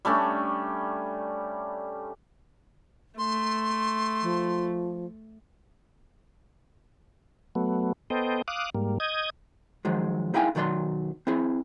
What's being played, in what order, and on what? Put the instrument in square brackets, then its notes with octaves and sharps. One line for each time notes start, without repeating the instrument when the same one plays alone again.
[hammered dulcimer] G3 A3 C#4 D4
[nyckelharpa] A3 [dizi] C6
[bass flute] F3
[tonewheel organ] F#3 A3 B3
B3 A4 C5 D#5 G5
F5 D6 D#6 F#6
G#2 G3 A#3
D#5 D#6 G6 G#6
[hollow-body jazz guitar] D#3 F3 F#3 G#3
D#4 E4 G#4 F5 G5 G#5
B1 D#3 F#3 C5 D5 C6
C4 E4 G#4